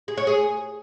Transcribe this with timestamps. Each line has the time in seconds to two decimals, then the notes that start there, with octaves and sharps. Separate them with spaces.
0.08 G#4
0.17 C#5
0.27 G#4